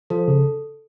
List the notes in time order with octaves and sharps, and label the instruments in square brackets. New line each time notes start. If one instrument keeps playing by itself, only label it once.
[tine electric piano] F3 [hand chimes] A4
[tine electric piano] C#3